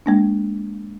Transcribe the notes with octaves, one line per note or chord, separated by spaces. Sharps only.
G#3 A#3 D4